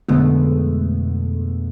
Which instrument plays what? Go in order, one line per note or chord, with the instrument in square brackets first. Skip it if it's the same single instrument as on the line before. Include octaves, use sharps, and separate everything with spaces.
[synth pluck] F2 B2 D3 G#3 A3 B3